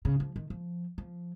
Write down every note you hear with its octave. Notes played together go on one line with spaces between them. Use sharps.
C#3
F3
D#3
F3
F3